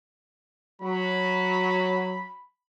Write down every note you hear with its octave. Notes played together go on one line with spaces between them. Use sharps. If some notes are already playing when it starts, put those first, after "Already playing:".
F#3 B5